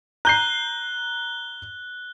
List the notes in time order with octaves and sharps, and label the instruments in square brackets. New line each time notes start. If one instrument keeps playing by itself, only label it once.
[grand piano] A#5 G6 C7 [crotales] F#6 G7